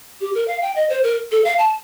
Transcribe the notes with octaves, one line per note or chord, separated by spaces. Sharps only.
G4
A#4
F5
G5
D#5
C5
A#4
A4
F5
A5